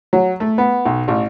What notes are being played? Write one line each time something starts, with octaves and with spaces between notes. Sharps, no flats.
F#3
A3
B3
B1
A1